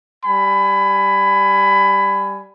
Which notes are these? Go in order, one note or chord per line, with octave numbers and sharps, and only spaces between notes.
G3 G#5 B5